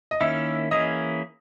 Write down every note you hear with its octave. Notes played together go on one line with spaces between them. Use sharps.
D#5
D#3 A#3 C#4 E4 E5
E3 A#3 C#4 E4 G#4 D#5